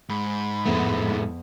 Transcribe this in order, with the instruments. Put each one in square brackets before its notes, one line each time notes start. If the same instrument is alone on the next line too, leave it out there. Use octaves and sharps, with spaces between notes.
[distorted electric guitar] G#2 [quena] B5
[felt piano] F2 B3 F#5 [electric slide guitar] A2 G#3 A3